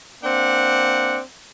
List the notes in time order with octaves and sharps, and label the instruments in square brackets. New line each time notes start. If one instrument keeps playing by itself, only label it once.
[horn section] A#3 C4 D4 F#5